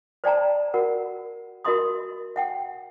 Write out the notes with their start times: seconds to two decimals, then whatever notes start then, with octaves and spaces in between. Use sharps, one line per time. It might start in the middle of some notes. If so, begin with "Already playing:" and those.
0.24 C5 D5 G5 A5 A#5
0.74 F#4 A#4 F#5
1.64 F#4 A#4 D#5 E5 C6 D#6
2.36 E5 F#5 G5